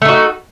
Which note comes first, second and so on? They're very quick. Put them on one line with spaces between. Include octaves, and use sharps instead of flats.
A3 D#4 F#4